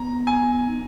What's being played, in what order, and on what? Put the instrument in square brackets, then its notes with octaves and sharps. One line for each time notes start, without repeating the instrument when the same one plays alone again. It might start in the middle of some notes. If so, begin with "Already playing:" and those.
Already playing: [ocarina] B3 [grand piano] A#5
[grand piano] G#5
[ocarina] D#4